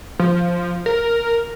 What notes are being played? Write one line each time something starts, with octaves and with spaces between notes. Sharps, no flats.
F3
A#4